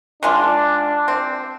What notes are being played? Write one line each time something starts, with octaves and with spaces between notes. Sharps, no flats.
D#3 G#3 D4 F4
C4